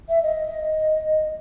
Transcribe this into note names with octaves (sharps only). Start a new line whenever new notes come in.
E5
D#5